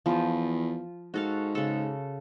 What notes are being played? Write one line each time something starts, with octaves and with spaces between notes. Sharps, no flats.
E2 F3
G#2 F#4 A4 F5
C#3 A4